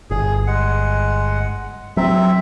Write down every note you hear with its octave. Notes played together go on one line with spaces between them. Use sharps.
G1 G#4
G#3 F#5
F#3 C4 E5